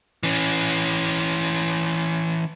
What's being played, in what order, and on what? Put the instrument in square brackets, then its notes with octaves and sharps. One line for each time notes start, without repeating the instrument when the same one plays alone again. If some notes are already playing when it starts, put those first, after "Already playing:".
[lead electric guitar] E3 C#4